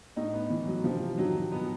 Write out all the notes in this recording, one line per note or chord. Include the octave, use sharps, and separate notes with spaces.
A2 D#4
B3
E3
F#3
C3 F3
D#3 F#3
B2 B3